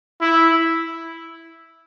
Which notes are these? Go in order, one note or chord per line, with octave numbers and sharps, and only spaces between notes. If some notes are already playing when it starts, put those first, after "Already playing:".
E4